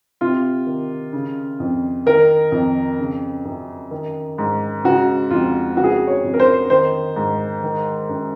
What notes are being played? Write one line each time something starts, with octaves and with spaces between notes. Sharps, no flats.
C3 F4
D#3
C#3
F2
D#3 A#4
F2
C#3
F#2
D#3
G#2
C#3 F#4
F2 F4
C#3 F#4
G#4
F#4
C#5
F2
A#4
C5
D#3 C5
G#2
D#3
F#2